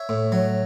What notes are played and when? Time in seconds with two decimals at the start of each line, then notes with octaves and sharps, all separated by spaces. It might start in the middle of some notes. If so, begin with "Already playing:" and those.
Already playing: C#5 E5
0.09 A2
0.32 F#3